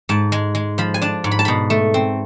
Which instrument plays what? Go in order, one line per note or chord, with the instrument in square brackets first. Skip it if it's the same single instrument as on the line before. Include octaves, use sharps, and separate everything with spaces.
[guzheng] G#2 A5
G#3
G#3
F3 B5
G#5
D4 A5
G#2
B5
A5
B2 B5
A3
C4